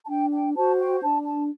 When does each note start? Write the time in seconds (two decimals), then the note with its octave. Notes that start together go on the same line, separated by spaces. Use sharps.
0.04 A5
0.08 D4 G5
0.32 G5
0.56 F#4 C5 A5
0.79 G5
1.02 D4 A5
1.26 A5